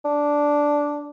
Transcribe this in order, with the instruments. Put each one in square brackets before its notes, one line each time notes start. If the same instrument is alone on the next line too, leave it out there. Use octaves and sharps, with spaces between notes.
[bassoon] D4